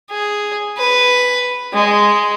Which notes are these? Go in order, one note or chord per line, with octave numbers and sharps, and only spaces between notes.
G#4
B4
G#3